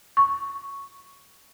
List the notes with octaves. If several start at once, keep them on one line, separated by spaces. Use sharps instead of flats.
C#6